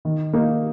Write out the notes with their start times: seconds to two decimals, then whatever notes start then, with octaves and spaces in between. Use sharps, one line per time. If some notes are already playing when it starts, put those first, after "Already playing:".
0.05 D#3
0.33 A#3 D#4